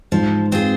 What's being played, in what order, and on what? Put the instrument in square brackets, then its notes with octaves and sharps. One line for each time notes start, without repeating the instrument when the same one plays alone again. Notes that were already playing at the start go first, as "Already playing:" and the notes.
[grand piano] G#2 [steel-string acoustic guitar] F3
[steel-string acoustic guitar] C4 F4 G#4